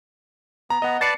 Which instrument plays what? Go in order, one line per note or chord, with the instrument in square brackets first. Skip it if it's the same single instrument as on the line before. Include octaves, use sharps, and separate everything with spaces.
[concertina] B3 [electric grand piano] A#5
[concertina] B3 A#5 [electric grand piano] D#5 F#5
[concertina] B4 D5 A5 [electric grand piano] A6 C7 C#7